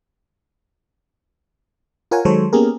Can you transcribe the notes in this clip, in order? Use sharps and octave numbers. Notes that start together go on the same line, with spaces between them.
F4 A#4 C#5 F#5 G#5
D#3 F#3 G#3 A4 C5 C#5
A#3 B3 C#4 G4 G#4 A#4